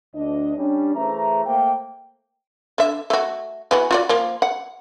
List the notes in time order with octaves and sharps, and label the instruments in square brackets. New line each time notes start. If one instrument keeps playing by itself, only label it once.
[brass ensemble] D2 D4 D#5
G3 C#4 D4
E3 A3 G#4 C5 E5 A#5
A3 A#3 C5 G5
[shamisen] D3 E5
A3 F#4
E3 B3 F#4
F4 F#4 D5
F3 A#3
F#5